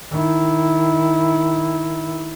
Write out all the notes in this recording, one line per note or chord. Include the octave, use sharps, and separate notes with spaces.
D#3 E4